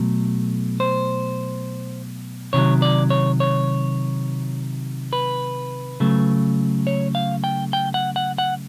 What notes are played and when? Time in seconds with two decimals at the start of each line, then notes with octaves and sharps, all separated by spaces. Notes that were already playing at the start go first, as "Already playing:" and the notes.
Already playing: B2 F#3 A3
0.80 C5
2.53 C3 D#3 F#3 C#5
2.82 D5
3.10 C#5
3.40 C#5
5.13 B4
6.00 C#3 F#3 A3
6.87 C#5
7.15 F5
7.44 G5
7.73 G5
7.94 F#5
8.16 F#5
8.38 F#5